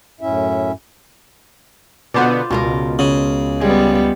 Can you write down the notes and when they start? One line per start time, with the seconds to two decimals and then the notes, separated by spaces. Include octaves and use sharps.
0.21 F#2 A2 C#4 E4 E5
2.14 B2 D3 B3 F4 C5 D5
2.51 C#2 B2 F4 A#4
2.99 C#3
3.61 G3 G#3 B3